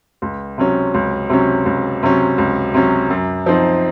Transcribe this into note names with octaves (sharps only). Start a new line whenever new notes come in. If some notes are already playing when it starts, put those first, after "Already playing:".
C#2
C3 F#3 C#4
C#2
C3 F#3 C#4
C#2
C3 F#3 C#4
C#2
C3 F#3 C#4
F#2
F3 C4 D#4